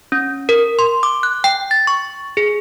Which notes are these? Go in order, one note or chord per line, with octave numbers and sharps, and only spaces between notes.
C#4
A#4
C6
D6
F#6
G5
A6
C#6
G#4